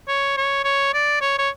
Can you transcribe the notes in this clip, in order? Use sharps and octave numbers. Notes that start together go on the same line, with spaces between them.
C#5
C#5
C#5
D5
C#5
C#5